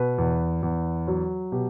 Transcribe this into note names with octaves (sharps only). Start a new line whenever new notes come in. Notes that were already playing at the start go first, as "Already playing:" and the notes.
Already playing: B2 B4
E2
E2
F#3
B2 G4